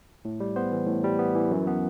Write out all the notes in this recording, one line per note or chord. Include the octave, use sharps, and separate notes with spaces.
A2
G3
B3 C5
E3
A2
G3
B3
E3
F#2
B3